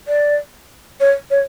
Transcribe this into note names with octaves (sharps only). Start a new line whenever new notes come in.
D5
C#5
C#5